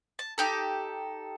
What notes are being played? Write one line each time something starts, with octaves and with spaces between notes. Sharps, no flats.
A5
D#4 G4 A4